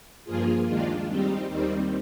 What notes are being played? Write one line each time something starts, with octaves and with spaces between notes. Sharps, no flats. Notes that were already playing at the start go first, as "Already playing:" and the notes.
G2 F3 A#3 F4 G#4
D#2 D#3 G#3 D4 F4
G3 C4 D#4 G4
D#2 D#3 G3 C4